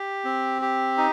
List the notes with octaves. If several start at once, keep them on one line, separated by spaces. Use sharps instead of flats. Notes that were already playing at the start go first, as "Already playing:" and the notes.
Already playing: G4
C4
G4
D#4